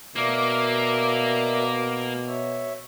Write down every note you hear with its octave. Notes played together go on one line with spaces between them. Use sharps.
B2 A#3 A#4 D5 E5
C#5 E5